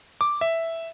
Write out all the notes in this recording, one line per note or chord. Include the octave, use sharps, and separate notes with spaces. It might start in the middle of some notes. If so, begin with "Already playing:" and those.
D6
E5